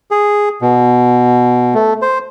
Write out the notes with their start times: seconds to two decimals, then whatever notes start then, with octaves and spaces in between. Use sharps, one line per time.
0.11 G#4
0.62 B2
1.74 A3
2.02 C5